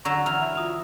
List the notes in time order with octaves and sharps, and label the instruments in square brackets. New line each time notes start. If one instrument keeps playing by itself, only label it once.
[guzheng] D3 F#3 [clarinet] A#5 [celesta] C#6 E6 E7
[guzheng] E3 [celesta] A#5 [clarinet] F6
[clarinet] E5
[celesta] F4 D#6 F7